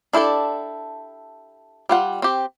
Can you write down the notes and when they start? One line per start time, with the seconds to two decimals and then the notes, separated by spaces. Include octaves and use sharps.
0.13 D4 E4 G4 A4 D5
1.89 G3 F4 F#5
2.22 C4 G4